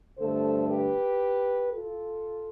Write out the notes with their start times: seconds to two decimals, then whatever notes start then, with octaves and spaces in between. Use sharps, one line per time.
0.19 G2 D3 A3 A4 C5
0.70 G4 B4
1.73 F4 A4